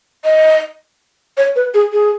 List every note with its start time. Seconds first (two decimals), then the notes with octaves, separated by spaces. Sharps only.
0.25 D#5
1.37 C#5
1.56 B4
1.74 G#4
1.93 G#4